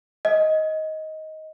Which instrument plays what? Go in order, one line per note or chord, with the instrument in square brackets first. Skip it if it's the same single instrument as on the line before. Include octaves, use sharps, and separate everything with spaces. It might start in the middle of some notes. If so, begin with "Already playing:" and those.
[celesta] D#5